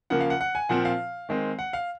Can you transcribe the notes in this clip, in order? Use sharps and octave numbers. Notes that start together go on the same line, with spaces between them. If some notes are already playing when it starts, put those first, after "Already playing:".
C#3 F3 A#3 F#5
F5
F#5
F#5
G#5
A#2 F3 C4 F#5
F5
D#3 G#3 C4
F#5
F5